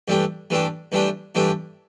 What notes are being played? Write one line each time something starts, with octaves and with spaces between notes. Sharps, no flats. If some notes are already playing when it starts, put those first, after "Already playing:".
G2 E3 A3 D4 G4
G2 E3 A3 D4 G4
G2 E3 A3 D4 G4
G2 E3 A3 D4 G4